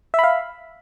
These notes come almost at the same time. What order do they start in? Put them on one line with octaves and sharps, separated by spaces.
E5 B5 F5